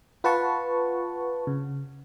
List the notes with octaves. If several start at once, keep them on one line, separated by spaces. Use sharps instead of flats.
F4 B4 F#5 A5 C#6
C#3